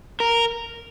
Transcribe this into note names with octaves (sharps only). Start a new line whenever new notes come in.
A#4